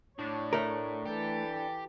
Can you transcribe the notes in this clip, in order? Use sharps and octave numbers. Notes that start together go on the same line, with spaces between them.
A2 D4 C#5
A3 A#4
E3 G4 A4